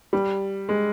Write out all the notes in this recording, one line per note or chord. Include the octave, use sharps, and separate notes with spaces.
G3
G#3